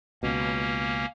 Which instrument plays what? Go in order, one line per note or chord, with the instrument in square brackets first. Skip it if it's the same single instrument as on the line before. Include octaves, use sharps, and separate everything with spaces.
[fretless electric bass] C#2 B2 [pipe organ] A#3 C#4